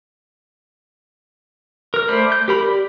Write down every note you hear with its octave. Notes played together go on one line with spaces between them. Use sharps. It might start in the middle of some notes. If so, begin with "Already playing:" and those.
A#4 F6
A3 C5 D5 B5
G6
G4 A#4 B5
G4 D5